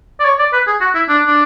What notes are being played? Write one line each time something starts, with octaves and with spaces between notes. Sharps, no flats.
D5
C#5
D5
B4
G#4
F#4
E4
D4
D4